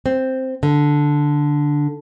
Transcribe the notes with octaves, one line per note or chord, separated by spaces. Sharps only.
C4
D3